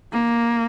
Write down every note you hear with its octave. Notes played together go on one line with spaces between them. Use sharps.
A#3